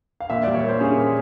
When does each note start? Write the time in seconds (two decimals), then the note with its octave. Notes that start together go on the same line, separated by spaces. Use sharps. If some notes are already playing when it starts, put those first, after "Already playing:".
0.20 F5
0.30 A#2 E5
0.43 G3 D5
0.55 C#5
0.63 A#3 C5
0.80 C#4 G#4
0.97 A#2